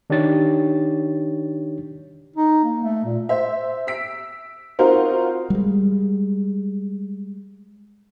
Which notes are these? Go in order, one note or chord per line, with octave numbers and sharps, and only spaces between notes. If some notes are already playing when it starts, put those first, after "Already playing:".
D#3 D4 D#4 G4 C#5 A6
D#4
A#3
A3
A#2
C5 E5
E6 B6 D7
C4 D#4 F4 F#4 A#4 C5
G3 G#3